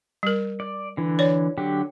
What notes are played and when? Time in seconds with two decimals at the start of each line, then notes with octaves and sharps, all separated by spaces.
0.23 G3 A#4
0.60 D5
0.97 D3 E3
1.19 C#5 D5
1.58 D3 F#3 G4